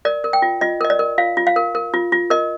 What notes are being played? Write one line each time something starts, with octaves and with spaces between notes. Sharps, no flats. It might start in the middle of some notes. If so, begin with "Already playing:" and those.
A#4 D5
A#4
G5
F4
F4 D#5
A#4 D#5
D5
A#4
F4 F5
F4
F5
A#4
A#4
F4
F4
A#4 D#5